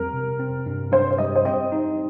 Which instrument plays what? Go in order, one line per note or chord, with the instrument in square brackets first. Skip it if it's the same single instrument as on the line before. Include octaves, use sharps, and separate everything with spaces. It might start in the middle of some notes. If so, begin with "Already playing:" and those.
Already playing: [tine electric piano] F2 G3 C4 [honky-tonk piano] A#4
[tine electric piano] C3
C4
G2
[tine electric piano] G2 [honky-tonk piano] C5
[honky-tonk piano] C5
[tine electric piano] G3 [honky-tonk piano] D#5
[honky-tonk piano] C5
[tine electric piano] C4 [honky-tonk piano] D#5
[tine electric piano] D#4